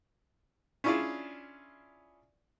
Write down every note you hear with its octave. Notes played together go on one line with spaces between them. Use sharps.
C#4 D4 E4 F4 G#4 D5